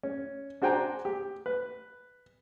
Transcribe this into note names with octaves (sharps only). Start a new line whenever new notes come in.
C#4
D4 F#4 C5 G5 G#5 A#5
G4
B4